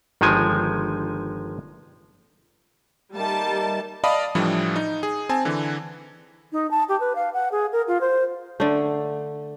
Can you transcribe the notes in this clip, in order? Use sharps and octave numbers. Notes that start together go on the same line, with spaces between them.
G1 D#3 F3 G#3 G#5
D#3 G3 A3 A#3 A5
D5 D#5 F5 A5 B5 D#6
A2 E3 F3 G3 D4 E4
D#4
G#4
C4 G#5 A5
D3 E3
D#4
A5
G4
B4
F5
F#5
G#4
A#4
F4
C5
D3 A3